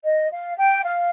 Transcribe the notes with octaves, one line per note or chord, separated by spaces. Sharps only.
D#5
F5
G5
F5